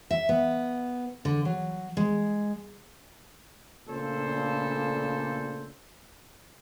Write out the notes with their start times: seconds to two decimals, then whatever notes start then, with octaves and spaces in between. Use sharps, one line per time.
0.11 E5
0.29 B3
1.25 D3
1.45 F#3
1.97 G#3
3.88 A#2 C#3 A3 D4 A4 C5